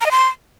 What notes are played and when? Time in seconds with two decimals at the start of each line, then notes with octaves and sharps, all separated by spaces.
0.01 A#5
0.06 D#5
0.11 C6